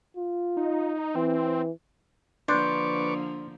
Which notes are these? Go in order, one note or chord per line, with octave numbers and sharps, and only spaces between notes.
F4
D#4
E3 C4
D3 F3 A#3 D4 B4 C5 C#6 D6